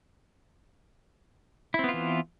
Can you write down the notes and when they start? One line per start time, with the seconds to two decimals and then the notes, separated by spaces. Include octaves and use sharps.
1.74 E4
1.79 C4
1.84 B3
1.89 F4
1.93 E3